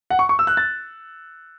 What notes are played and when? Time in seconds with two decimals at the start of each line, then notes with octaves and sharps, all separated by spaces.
0.10 F#5
0.19 C#6
0.29 C#6
0.39 E6
0.47 F#6
0.57 A6